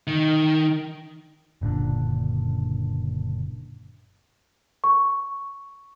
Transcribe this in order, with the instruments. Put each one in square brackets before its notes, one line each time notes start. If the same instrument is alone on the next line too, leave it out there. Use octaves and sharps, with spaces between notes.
[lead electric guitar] D#3
[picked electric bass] F#1 A#2 D3 D4
[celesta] C#6